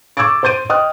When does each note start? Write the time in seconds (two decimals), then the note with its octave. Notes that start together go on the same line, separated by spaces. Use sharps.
0.17 C#6 D6 E6 G#6 A6 D7
0.43 C5 C6 G6 D7 D#7
0.69 D#5 G5 D#6 F6 F#6